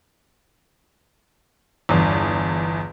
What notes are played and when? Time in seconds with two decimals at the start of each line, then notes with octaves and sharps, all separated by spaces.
1.89 G1 E2